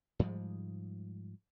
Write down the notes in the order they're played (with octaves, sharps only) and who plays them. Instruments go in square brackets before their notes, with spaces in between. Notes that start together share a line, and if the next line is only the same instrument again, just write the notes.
[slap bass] G#2 F3 G3 G#3